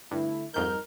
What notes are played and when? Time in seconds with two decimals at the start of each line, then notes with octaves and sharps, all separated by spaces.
0.11 G2 D3 A3 E4
0.54 F2 G#2 G3 D#4 A#4 G6